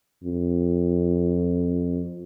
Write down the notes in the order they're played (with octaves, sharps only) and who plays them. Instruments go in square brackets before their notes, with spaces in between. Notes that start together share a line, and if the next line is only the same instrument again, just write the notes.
[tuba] F2